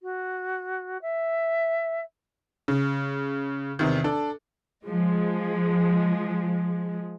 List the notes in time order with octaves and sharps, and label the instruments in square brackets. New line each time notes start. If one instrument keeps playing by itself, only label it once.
[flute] F#4
E5
[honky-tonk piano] C#3
E2 C3 D#3
D4 A4
[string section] F3 G#3